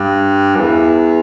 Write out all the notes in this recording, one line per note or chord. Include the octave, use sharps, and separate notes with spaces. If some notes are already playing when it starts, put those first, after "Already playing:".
Already playing: G2
F#2
E2